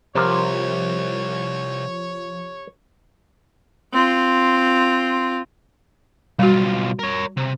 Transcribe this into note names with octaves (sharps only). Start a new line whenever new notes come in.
C2 C3 F3 A#4 C5 C#5
C4 F4
B1 G3 F4 F#4
A#4 C#5
C3